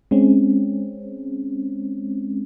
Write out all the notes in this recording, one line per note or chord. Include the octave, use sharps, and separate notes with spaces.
G#3 C4 C#4